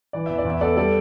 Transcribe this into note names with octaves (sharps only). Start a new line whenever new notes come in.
E3 D5
E2 E5
D5
E2
E5
B3 A4 D5
G3 A4 D5